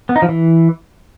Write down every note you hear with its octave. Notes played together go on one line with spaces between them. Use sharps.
B3
D#4
F3
E3